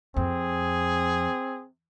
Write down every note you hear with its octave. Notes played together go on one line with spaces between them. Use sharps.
F2 C4 G#4